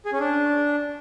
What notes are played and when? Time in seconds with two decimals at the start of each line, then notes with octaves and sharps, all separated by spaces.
0.06 G#4
0.13 C#4
0.20 D4